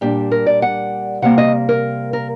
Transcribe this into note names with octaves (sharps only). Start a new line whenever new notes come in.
A#2 G3 D4 G4
A#4
D5
F#5
C3 G3 A#3 F#5
D#5
A#4
A#4